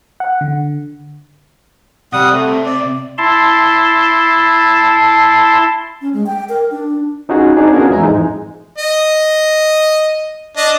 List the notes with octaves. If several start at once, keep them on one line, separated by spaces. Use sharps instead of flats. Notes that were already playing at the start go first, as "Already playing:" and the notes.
F#5
D3
C3 G3 F#5 D#6
A3
D5
E4 A5 C6
C#4
G#3
G5
A#4
D4
C#4 D#4 F4 F#4 G#4
C4 D4 D#4 G#4
B3 C#4 F4 F#4 G#4 A#4
E2 E3 G#3 E5 G#5 A#5
F2 G#2 E3 G#3 D#4
D#5
D4 D#5